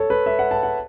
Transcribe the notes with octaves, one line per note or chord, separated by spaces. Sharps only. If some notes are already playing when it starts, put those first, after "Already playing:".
Already playing: A4 C#5
B4
E5
F#5
A5
F#5